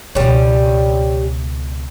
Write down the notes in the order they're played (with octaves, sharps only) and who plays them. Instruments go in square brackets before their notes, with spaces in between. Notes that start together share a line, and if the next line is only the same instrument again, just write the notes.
[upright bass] C#2 B2 [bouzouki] G3 C#4